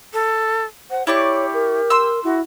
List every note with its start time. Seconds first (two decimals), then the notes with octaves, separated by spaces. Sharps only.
0.13 A4
0.91 C5 F#5
1.07 E4 G4 C#5 D5 C#6
1.54 A#4
1.90 C6 E6
2.24 E4 F#4